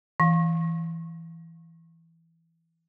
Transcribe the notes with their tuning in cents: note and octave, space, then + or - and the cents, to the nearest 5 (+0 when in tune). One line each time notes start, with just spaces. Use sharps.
E3 +0 F5 +15